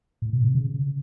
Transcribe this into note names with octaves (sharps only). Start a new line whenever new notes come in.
A2
B2
C3
C#3